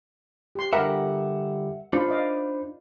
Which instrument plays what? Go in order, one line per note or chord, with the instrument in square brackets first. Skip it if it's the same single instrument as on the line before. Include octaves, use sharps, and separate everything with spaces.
[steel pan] G4 C6
[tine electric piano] D3 G3 G4 [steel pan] A#4 A#5 B5 [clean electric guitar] E5 F#5
[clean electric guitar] D4 D#4 [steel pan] F4 [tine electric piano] C5 B5
[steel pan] D5 D#5 F5